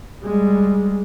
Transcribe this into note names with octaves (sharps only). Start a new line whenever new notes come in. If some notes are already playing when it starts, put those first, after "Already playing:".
G3 G#3